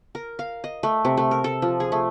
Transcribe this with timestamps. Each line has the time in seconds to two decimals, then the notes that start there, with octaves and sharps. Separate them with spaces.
0.15 A#4
0.39 F5
0.64 D#5
0.83 A3
1.05 C3
1.17 A3
1.31 A#4
1.44 A4
1.62 F3
1.80 G#4
1.92 A3